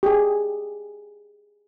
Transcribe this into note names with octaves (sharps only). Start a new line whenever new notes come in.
G4 G#4